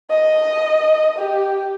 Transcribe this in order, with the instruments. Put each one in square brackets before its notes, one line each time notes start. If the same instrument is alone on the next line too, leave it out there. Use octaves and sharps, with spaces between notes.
[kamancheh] D#5
G4